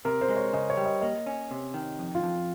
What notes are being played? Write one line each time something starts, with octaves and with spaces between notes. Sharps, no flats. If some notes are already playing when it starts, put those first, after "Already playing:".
C3 A#4
C5
G#3
C#5
C#3 D#5
C#5
G3
D#5
A#3 D#5
C#4
C3
D#3
F2
F4
F2